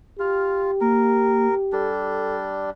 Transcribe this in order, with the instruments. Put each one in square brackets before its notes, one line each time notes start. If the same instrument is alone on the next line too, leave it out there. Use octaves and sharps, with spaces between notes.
[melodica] F4 [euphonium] G4 [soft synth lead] F6
[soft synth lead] A#3 [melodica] A#4
[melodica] G3 D4 [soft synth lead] A4